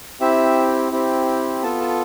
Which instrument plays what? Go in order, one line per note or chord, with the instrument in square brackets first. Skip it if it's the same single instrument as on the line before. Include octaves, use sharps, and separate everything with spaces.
[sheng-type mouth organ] C4 E4 G4 E5
C4 E4 G4
B3 F4 A4 A5
A5